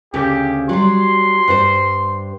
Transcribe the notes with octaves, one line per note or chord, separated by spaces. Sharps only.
D2 C#3 G4
F#3 G3 C6
G2 G3 C5